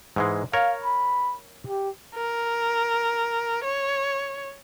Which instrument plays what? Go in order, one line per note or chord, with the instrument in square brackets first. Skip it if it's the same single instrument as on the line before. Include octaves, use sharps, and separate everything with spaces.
[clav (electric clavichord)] G#2 E3 G#3
[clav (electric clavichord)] A#4 C#5 [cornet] F5
[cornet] B5
G4
[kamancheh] A#4
C#5